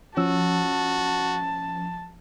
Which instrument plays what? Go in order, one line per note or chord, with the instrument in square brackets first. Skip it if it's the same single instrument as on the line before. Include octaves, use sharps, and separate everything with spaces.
[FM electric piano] F3 [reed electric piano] C#4 E6 [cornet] F#4 [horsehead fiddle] A5